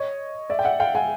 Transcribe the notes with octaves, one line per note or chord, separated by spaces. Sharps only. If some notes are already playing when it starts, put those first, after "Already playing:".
Already playing: C#5 D#5
D5 E5
G5
E5 F#5
F5 G5
F#5 G#5